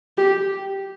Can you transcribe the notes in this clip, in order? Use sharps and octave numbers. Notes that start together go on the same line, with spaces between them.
G4